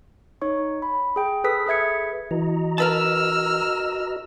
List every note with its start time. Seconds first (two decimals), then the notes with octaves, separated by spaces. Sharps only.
0.42 D#4 C#5 C#6
0.82 B5
1.16 G#4 G5
1.44 G#4 A4 B4 D#6 B6
1.67 G#4 B4 E5 G#6 C#7
2.31 E3 F#4 D#5 A#5
2.78 A#4 B4 A5 E6 F6